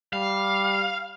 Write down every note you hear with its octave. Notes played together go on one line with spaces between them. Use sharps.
G3 F5